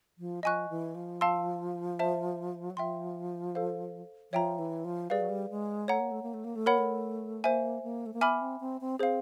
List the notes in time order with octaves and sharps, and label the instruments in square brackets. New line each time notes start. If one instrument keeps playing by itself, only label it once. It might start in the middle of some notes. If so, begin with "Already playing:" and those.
[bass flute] F3
[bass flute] F3 [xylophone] D#5 G#5 C#6 F#6
[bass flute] E3
F3
[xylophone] F5 A5 C6 E6
C5 E5 A5
[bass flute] F#3
[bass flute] F3 [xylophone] E5 G5 C6
[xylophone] A4 C5 F5
[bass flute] F3 [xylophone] C#5 E5 G5 A#5
[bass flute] E3
F3
[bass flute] G3 [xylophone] G#4 B4 D5 F5
[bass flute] F#3
G3
G#3
[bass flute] A3 [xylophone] C#5 F#5 A#5
[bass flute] A#3
A3
A#3
A3
A#3
A3
[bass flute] A#3 [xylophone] A#4 C#5 F#5 B5
[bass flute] A3
[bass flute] A#3 [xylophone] C5 E5 G#5
[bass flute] A#3
A3
A#3
[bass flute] B3 [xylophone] E5 G#5 B5 D6 F6
[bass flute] C4
C4
C4
[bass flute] C4 [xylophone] G#4 C5 F5